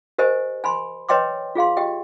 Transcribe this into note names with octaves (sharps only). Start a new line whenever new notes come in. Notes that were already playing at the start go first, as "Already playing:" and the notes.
G4 A#4 C5 D#5 G#5
G#5 B5 C6
B4 C#5 D#5 G5 C6 D6
F4 G#4 F5 C6
G4 D#5 G5